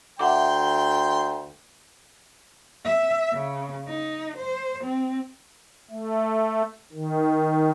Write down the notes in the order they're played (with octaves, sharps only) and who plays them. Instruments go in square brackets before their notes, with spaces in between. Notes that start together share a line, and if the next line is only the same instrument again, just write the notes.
[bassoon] D2 [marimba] E5 F#5 D6 [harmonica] G5 C6
[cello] E5
C#3
D#4
C5
C4
[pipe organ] A3
D#3